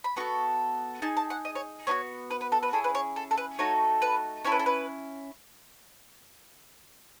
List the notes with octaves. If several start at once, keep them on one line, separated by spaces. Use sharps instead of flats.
B5
B3 F#4 A4 C#6
D#4 G#4 A5
A5
F#5
D#5
C#5
B3 D#4 F#4 C#5
B4
B4
A4
B4
C#4 E4 G#4 A4
B4
C#5
A4
A4
B4
A3 D#4 F#4 A4 C#5
B4
C#4 E4 A4 C#5
B4
A4
B4